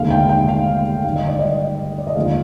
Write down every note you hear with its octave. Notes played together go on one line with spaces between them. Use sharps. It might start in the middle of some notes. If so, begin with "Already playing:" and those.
Already playing: F1 D#2 D3 G#3 F5
G5
G5
F5
G#1 G2 D3 G3 F5
D#5
D5
D#5
D5
D#5
D#2 D3 F3 G#3 F5